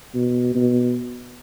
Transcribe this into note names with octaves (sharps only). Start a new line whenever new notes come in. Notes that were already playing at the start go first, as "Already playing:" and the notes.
B2
B2